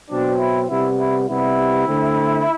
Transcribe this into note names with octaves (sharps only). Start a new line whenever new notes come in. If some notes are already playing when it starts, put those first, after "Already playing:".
B2 F#3 C4 D4
E4
C3 G3 B3 E4
E4
C3 G3 B3 E4
D3 A3 C4